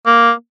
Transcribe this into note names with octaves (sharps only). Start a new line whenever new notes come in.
A#3